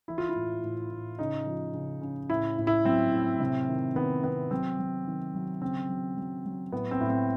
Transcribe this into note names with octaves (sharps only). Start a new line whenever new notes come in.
E3 E4
F4
E4
A2
A2
A2
C#3 D#4
F3
C#3
C#3
A2 E4
A2
E4
F#3 C4
A2
C3
D#3
D#3 B3
C3 B3
F#3 C4
F#3
D#3
F#3
C#3 C4
F#3
F#3
F#3
A2 B3
C4
A2
C4